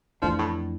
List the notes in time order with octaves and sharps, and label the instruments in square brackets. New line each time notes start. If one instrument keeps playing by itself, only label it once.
[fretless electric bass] F2 E3 A3 D4 [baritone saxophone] F3
[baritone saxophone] A2